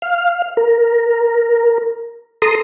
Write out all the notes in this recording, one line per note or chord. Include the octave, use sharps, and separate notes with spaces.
F5
A#4
A4 A#5 C6 D#6